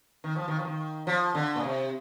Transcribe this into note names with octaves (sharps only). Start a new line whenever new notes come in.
D#3
F3
D#3
F3
D#3
F3
D3
A#2
C3